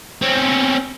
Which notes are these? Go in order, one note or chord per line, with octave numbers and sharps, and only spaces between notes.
C4 C#4